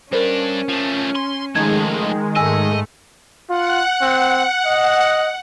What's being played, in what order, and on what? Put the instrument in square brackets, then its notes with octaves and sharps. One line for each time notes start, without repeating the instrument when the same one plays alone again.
[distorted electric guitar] G2 D4 [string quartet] C#4 [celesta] A#4 C5
[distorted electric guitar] F3 A3
C6
[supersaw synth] D#3 G#3 [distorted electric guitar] F3 A3 [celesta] G#6
[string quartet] G#2 A3 [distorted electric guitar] D#5 [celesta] G#5 E6
[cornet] F4 [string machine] F#5
[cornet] C4
D#5